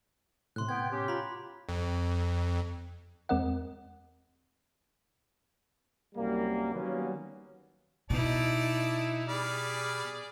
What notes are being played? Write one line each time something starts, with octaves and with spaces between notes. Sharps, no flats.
A2 C3 C6 F#6
B3 G5 G#6
C#4 G4
F4 A#5 B5
F2
E2 G#3 C4 A#4 D#5 F#5
C2 F#2 G3 A#3
D#3 F#3 G3 A#3 B3 C#4
B2 D#4 E4 D5 A5
G3 G#4 D5 B5 F6